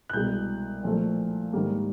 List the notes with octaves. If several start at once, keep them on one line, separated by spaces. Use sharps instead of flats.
F#6
C2 B2 G#3 G6
A#2 F3 A3
G#2 D#3 G3 A#3